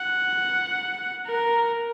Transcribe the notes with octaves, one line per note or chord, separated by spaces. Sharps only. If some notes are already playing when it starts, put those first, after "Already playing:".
Already playing: F#5
A#4